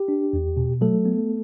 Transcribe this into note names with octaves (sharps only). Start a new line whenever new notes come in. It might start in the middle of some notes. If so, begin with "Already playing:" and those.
Already playing: G4
D4
E2
B2
F#3 A3 A4
B3